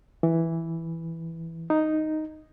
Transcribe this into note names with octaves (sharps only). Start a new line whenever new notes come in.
E3
D#4